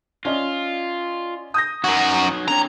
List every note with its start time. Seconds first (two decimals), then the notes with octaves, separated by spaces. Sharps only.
0.25 C#4 F4 D5 D#5
1.54 D#6 G6 A#6
1.84 F#2 F#3 D#4 F#4
2.48 D3 C4 C#5 A#5